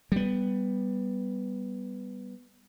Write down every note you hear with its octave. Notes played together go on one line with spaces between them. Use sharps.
G3 B3